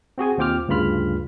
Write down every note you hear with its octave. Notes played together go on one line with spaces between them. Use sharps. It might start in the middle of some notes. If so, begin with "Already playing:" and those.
C4 F#4 G#4 G#5
D#2 C4 F4 G5 D6 F6
D2 G2 C#3 F4 B5 F6